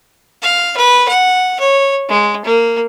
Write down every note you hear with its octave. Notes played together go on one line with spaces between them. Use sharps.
F5
B4
F#5
C#5
G#3
A#3